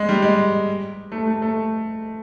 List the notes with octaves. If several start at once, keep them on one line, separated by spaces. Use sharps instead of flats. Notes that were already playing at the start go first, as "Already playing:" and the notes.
Already playing: G#3
G3
G#3
A3
A3
A3